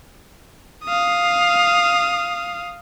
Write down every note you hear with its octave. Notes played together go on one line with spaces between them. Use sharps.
F5 D#6